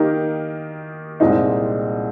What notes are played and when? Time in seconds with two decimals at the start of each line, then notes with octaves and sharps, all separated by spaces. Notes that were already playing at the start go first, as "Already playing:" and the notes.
Already playing: D#3 A#3 D#4 G4
1.20 C2 A#2 G#3 C4 D#4